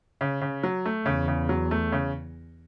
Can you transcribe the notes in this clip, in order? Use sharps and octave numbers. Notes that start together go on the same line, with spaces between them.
C#3
C#3
F#3
A3
E2 C#3
C#3
F#3
A3
C#3